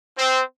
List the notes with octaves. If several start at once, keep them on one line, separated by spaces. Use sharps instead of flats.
C4